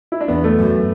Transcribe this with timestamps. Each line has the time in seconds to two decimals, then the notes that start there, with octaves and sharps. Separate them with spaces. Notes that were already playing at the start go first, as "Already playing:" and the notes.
0.12 E4
0.21 D4
0.28 E2 B3
0.44 A3
0.58 F#2